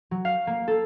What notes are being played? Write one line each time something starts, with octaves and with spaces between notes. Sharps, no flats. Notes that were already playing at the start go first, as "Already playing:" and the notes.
F#3
F5
A#3
A4